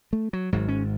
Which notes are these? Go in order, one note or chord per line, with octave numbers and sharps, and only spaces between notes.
A3
F#3
G#1 G#2 F#3
C#4